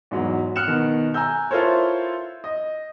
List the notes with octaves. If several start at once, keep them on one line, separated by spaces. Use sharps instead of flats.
E2 G#2 F#3
F6 F#6 C#7 E7
B2 D#3
G#5 A#5 E6 G6
E4 F4 A4 A#4 C5 C#5
D#5